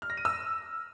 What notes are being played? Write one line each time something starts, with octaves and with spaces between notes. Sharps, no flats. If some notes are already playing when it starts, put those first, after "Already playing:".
F6
A#6
D#7
E6